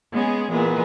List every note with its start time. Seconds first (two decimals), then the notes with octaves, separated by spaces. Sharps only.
0.12 G#3 B3 C#4 G#4
0.52 A#2 E3 G#3 B3